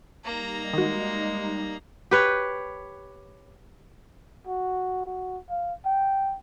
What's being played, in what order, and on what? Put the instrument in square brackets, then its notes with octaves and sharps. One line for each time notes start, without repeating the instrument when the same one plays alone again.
[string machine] G3 D#4 [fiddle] A#3 A#5
[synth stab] D#3 F#4 [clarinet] G#3
[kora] G4 B4 C#5
[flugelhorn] F#4
F#4
F5
G5